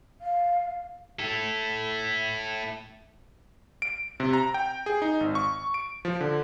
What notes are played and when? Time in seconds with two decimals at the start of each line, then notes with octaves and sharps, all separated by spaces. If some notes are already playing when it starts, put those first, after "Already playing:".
0.21 F5
1.19 E4 A4
3.82 D7
4.20 C3
4.33 A#5
4.54 G5
4.86 G#4
5.02 D#4
5.20 G#1
5.35 C#6
5.74 D7
6.05 F3
6.21 D3